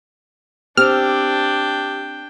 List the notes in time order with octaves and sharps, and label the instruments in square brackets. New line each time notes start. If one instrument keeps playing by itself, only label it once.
[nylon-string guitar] C4 [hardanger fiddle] D4 G5 [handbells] G4 E6 [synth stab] F6